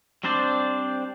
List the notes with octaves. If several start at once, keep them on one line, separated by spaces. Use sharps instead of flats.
G3 C4 D4 C5 D5